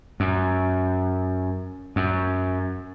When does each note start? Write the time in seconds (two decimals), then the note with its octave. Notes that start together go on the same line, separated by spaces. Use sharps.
0.20 F#2
1.96 F#2